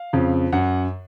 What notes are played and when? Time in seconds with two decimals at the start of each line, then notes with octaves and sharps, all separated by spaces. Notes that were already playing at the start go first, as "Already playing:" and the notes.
Already playing: F5
0.13 F2 C#3
0.52 F#2 F#5